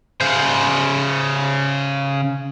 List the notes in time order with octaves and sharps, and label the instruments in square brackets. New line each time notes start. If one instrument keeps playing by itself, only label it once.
[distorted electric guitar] C#3 C5